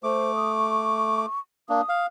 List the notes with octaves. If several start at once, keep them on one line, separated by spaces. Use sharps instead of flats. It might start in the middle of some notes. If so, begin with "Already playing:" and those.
A3 C5 D6
D#6
C#6
A#3 D4 D#6
F5